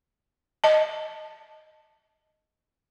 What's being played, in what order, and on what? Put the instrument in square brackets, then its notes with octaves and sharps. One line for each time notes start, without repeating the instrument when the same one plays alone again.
[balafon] D#5 A5